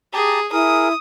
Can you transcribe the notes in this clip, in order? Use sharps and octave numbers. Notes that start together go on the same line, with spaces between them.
G4 G#4 A5 A#5
E4 G#4 A#4 D#6